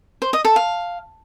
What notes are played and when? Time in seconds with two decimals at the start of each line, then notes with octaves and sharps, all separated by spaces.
0.22 C5
0.33 D#5
0.45 A4
0.56 F5